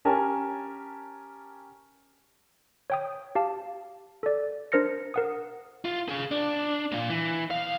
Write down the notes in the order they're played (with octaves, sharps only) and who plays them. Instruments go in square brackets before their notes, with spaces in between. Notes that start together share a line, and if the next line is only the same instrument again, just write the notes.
[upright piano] C#4 G4 A#4 G#5 A5
[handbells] C#5 G5 D#6
G4 F5 A5
A4 D5
D4 A#4 C5 F6 A#6 C#7
A#4 F#5 D#6
[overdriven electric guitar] F4
G#4 F5
D4
A#3 F4
E3
B1 F5